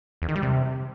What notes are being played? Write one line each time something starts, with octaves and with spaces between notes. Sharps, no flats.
E2
D#3
G3
C3